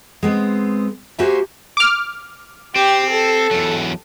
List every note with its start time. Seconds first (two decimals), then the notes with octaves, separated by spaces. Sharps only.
0.23 G#3 B3 C4
1.19 A#3 F#4 G4 C5 E5 G#5
1.77 D6 F6
2.76 C4 G4
3.10 A4
3.51 E2 F#3